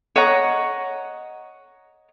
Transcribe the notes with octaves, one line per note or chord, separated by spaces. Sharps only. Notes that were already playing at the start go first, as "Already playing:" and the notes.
C#5 D#5 F#5 A#5